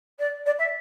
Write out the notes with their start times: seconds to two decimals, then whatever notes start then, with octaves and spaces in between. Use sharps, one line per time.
0.19 D5
0.46 D5
0.58 E5